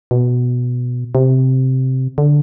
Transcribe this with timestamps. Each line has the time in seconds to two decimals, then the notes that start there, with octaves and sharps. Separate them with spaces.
0.11 B2
1.15 C3
2.18 D3